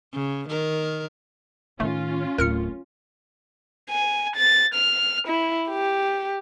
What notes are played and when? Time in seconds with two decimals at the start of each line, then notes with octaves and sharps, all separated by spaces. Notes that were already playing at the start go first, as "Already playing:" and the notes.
0.13 C#3
0.49 D#3 A#4
1.80 A2 D#3 A3 C#4 F4
2.38 D1 A2 A#4 F6 C#7
3.90 G#5
4.36 A6
4.74 F6
5.27 E4
5.69 G4